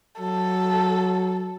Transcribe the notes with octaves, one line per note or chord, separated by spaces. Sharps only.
F#3 A4